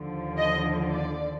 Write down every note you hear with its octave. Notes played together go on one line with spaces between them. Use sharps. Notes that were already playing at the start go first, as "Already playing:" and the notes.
Already playing: D#2 D3 F3
D#5
D5